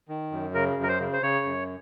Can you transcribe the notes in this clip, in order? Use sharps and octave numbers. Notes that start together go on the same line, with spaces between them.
D#3
F#2
C#3 A#4
F#2
A#4
C5
C#3
C5
C#3 C#5
F#2